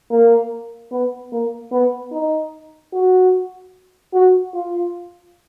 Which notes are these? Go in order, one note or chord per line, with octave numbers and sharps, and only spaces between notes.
A#3
B3
A#3
B3
D#4
F#4
F#4
F4